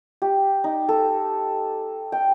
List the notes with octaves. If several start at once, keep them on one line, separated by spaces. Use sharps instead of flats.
G4
D#4
A4
G5